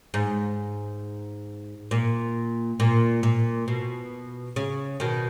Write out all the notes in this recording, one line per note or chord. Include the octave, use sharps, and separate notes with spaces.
G#2
A#2
A#2
A#2
B2
C#3
B2 D#3